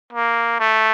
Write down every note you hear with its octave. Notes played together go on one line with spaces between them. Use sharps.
A#3
A3